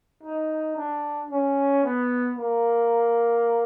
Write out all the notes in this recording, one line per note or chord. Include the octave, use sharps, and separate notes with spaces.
D#4
D4
C#4
B3
A#3